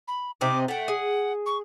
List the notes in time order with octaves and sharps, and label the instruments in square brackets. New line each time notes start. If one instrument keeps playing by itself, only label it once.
[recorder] B5
[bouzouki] C3 C4 D#4 [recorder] D6
[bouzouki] A3 G5 [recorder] F#5
[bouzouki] G#4
[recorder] C#6